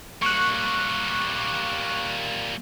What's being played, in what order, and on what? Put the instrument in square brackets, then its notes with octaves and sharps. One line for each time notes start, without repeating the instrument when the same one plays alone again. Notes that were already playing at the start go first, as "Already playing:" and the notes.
[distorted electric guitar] G3 A#3 [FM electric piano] C#6 F#6